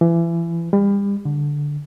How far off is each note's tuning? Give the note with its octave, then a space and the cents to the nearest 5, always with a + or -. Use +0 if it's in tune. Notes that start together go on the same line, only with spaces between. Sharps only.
E3 +30
G3 +35
D3 -5